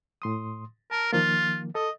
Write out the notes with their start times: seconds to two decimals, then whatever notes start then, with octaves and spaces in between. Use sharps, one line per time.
0.22 A2 C6 D#6
0.91 A#4 A5
1.13 D#3 F3 A#3 F4
1.75 A4 D#5